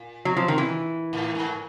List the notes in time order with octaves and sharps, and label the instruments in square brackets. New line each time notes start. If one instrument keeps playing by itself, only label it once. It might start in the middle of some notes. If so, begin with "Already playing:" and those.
Already playing: [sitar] A#2
[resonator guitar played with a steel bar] F#3
F3
D#3
E3
[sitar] A2
G#2